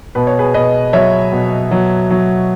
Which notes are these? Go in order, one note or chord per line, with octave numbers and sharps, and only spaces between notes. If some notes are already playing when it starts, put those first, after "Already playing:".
B2 B4
C#5
G#4 B4
B2 B4 D#5
F#3 C#5 E5
B2
F#3
F#3